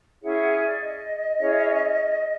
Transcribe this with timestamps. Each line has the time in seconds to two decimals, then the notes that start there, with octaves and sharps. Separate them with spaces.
0.22 C#4 E4 G#4 C#5 F#5
0.36 F#5
0.50 E5
0.65 D5
0.80 D#5
1.39 C#4 E4 G#4 C#5